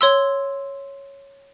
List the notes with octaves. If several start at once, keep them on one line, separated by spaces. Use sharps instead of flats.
C#5 C6 E6